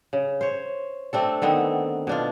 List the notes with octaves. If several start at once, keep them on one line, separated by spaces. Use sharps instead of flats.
C#3
C5 C#5
A3 C4 D4 A4
D3 D#3 B3 C4
B2 D4 F4